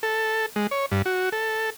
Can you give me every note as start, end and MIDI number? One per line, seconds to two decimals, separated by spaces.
0.03 0.46 69
0.56 0.67 56
0.71 0.86 73
0.91 1.02 43
1.06 1.29 66
1.32 1.70 69